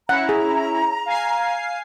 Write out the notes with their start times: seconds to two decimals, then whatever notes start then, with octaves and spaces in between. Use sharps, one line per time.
0.09 C#4 E4 F#5 A#5
0.29 G#4
1.06 F5 G#5 C7